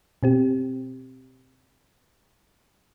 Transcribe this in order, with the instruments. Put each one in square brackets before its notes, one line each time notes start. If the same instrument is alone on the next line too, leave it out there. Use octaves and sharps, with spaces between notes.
[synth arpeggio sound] B2 C4 G4